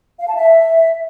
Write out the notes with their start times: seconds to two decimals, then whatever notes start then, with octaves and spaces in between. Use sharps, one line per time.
0.19 F5
0.27 A5
0.35 E5